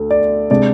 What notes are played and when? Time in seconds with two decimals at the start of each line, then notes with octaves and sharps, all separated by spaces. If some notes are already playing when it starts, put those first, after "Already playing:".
Already playing: D2 D3
0.10 D5
0.50 C3 G#3 D4 D5